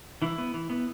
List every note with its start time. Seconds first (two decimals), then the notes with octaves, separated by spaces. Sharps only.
0.22 E3 E4
0.38 B3
0.54 E3
0.70 B3